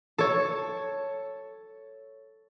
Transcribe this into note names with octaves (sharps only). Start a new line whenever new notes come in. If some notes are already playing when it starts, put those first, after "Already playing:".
A4 C#5